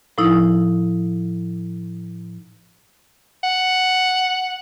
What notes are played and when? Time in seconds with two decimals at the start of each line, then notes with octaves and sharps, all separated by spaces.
0.18 A2 F3 D#4 E4
3.44 F#5